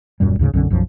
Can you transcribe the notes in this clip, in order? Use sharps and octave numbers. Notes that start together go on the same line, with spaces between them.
D#1 F#2 A#2 G3
D2 G#2 C#3
B1 F#2 D3 C#4
B1 F#2 F3